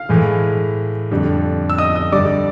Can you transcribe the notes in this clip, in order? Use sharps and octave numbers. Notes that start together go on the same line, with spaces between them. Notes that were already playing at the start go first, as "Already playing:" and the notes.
Already playing: F5 F6
A2 E3 G#3
F2 D3 G3
E6
D#5 D#6
D#5 D#6
G2 D3 G3 D5 D6